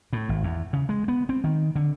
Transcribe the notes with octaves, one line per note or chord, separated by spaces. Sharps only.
A2
G#1
E2
C#3
G#3
B3
C4
D#3
D3